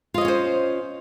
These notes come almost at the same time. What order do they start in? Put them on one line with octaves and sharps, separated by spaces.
F4 D#5 C#5 C#4 C5